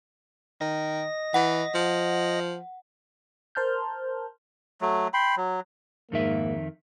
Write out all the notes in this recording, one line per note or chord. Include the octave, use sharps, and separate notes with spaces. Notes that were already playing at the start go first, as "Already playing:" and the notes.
D#3 D#5 A#6
E3 F#5
F3
A#4 C5 A5 F6 G6
F#3 A3
G5 B5 C6
F#3
F2 G#2 D#3 A#3 E5